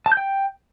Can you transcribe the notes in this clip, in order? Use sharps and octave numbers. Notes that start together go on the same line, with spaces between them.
A5
G6
G5